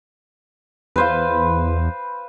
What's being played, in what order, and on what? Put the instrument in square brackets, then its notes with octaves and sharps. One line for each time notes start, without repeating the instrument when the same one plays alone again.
[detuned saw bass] E2 [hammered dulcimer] B4 C5 F5